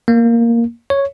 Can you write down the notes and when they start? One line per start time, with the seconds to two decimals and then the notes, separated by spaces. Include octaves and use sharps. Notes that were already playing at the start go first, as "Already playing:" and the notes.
0.08 A#3
0.90 C#5